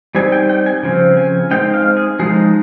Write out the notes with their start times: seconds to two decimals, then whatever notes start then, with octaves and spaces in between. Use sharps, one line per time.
0.15 G3 C4 D#4 G#5
0.32 G5
0.49 G5
0.66 G#5
0.83 C#3 F3 C4
1.17 G#5
1.51 G#3 C4 D#4 G5
1.74 F5
1.97 G#4
2.19 F3 G#3 D#4 G#4